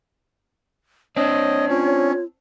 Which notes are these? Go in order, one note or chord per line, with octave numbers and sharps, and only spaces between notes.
C4 D4 C#5 D#5
C#4 F4